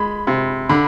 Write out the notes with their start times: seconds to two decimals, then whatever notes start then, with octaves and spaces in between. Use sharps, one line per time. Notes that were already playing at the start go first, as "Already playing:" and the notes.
Already playing: G#3 B5
0.27 C3
0.69 D3 B5